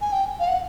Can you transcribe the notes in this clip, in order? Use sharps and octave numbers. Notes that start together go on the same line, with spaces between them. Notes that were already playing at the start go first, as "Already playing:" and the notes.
G#5
G5
F5
F#5